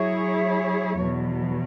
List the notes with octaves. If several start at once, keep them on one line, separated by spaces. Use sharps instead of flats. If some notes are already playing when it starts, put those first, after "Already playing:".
Already playing: F#3 E4 G#4 C#5
E2 B2 F#3